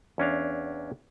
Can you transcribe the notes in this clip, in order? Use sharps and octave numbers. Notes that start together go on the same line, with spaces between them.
E2 C#4 D4 F5